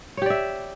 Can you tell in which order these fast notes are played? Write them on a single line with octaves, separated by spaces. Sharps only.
C#5 G4 D5 E5